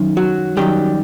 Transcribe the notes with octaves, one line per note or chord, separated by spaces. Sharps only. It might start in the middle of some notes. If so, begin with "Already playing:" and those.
Already playing: F#2 D#3
F#3 F#4
F#2 D#3 F#3 G3 G4